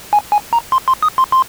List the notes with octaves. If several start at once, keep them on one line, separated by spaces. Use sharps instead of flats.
G#5
G#5
A#5
C6
C6
D#6
C6
C6